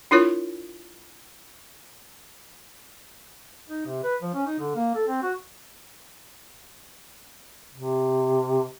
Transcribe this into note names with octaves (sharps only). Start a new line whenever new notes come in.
D4 E4 F4 A#4 C#5
D#4
C3
B4
F3
C#4
D#4
D3
A#3
A4
C4
F#4
C3